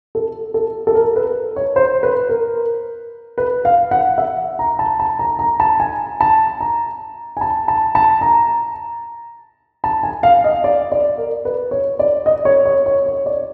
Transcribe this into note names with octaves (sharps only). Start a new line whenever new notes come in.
A4
A4
A4
A#4
B4
C#5
C5
B4
A#4
B4
F5
F#5
E5
A#5
A5
A5
A#5
A#5
A5
G#5
A5
A#5
G#5
A5
A5
A5
A#5
A5
G#5
F5
D#5
D5
D5
A#4
B4
C#5
D5
D#5
C#5
C#5
C#5
C#5
D5